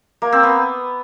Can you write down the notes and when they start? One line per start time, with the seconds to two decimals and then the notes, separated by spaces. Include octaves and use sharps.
0.22 A#3
0.32 C4
0.43 B3